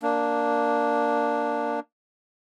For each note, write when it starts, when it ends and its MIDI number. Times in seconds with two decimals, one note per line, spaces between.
0.02 1.80 58
0.02 1.80 62